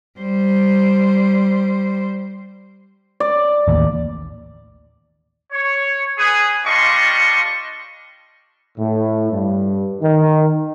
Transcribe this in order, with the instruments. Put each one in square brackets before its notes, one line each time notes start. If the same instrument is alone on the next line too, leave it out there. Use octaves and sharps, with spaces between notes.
[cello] G3 C5
[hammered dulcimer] D5
[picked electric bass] A1 D#2
[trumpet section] C#5
G#4 B4
G3 D4 F4 D#5 C6 C#6
[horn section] A2
G2
D#3